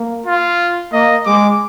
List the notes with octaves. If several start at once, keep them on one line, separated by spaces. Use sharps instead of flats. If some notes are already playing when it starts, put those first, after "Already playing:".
Already playing: A#3
F4
A#3 D#5
G#3 D6